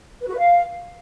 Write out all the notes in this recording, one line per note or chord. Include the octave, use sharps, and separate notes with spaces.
B4
F#4
B4
F5